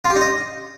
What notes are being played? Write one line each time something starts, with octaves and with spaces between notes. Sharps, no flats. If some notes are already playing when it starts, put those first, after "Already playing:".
F4
G4
D#4
D#5